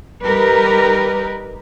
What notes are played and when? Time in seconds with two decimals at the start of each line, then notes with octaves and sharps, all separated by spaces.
0.22 G3 D#4 G4 A#4 B4